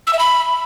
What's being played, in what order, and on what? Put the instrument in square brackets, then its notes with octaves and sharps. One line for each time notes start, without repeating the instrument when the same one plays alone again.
[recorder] E6
E5
B5